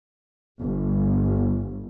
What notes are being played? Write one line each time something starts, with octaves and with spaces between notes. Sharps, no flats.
G1